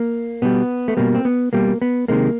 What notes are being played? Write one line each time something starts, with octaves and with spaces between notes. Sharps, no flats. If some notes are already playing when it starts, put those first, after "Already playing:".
Already playing: A#3
B2 G3 B3
A3
B2 G3 A#3
C4
B3
B2 G3 A#3
B3
C3 D#3 G#3 A#3